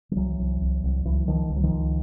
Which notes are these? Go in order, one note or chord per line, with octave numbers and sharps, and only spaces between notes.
F3
C2 E3 F#3
C2
C2
C2
C#2 E3 F#3
C#2 D#3 F3
C#2 F3
F#3
D#3 F3
C#2